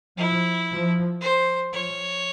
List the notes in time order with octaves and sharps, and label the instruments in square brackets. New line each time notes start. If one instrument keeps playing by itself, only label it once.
[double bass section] F3 [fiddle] E4
[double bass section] F3
[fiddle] C5
[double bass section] F3 [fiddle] C#5